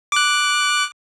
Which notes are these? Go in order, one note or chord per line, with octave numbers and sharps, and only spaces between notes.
D6 F#6